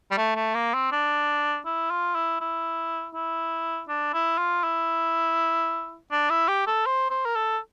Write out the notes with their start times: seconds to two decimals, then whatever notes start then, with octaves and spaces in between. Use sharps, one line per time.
0.11 G3
0.17 A3
0.35 A3
0.54 A#3
0.74 C4
0.92 D4
1.66 E4
1.90 F4
2.15 E4
2.40 E4
3.14 E4
3.88 D4
4.14 E4
4.38 F4
4.63 E4
6.11 D4
6.30 E4
6.48 G4
6.66 A4
6.86 C5
7.10 C5
7.25 A#4
7.35 A4